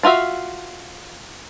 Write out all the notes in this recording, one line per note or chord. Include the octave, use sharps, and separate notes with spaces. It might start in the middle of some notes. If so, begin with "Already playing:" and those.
D4 F4 F#4 E5 F5